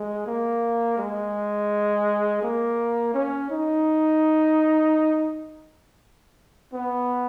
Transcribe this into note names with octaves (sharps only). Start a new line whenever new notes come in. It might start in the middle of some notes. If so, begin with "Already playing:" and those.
Already playing: G#3
A#3
G#3
A#3
C#4
D#4
B3